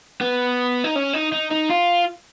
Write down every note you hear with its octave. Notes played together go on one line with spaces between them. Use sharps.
B3
D#4
C#4
D#4
D#4
D#4
F4